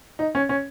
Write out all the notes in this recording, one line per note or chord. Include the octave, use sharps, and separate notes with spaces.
D#4
C#4
C#4